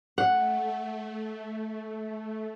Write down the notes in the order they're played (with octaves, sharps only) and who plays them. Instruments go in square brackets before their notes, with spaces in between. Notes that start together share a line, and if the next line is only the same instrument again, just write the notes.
[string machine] A3 [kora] F#5